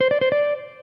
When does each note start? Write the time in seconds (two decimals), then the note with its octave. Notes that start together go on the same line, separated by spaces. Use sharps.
0.01 C5
0.11 D5
0.21 C5
0.32 D5